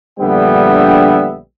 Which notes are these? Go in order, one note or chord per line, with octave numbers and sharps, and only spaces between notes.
A#1 D3 G3 B3 E5 G5